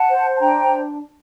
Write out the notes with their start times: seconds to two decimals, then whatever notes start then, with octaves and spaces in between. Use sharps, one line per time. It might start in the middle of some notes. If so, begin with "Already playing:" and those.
Already playing: F#5 A5
0.09 C5
0.36 A5
0.40 D4 G5 A#5